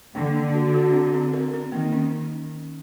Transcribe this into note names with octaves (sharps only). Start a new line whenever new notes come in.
D3 A#3
A#3
F#4
F#4
C4
C4
A#4
C4
D#3 A#3
C#4